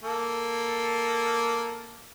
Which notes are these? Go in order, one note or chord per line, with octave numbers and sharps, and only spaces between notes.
A#3 A4